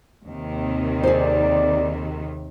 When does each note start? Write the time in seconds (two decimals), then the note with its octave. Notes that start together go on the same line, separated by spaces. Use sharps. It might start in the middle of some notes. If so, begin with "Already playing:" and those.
0.28 D#2 C3 D#3
1.03 D#4 G#4 A4 C5 D5